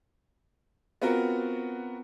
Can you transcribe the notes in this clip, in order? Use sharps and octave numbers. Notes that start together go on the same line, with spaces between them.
B3 C4 F4 F#4 A#4